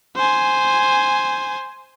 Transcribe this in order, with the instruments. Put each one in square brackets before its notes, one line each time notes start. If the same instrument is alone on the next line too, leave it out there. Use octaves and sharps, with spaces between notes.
[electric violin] C5 G#5